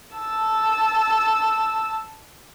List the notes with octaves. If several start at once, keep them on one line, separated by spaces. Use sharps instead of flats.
A5 E6